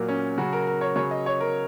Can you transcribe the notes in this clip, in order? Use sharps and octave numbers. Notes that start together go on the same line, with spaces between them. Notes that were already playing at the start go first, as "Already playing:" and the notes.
Already playing: A#2 F#3 A#3
C#4
C#3 F#3 F#4
A#4
A#4
C#5
C#3 F#3 C#5
D#5
C#5
A#4